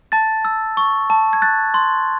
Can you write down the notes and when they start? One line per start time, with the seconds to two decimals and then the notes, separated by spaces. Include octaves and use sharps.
0.12 A5 A6
0.45 E6
0.77 C#6
1.10 A5
1.33 G#6
1.42 F#6 A6
1.74 C6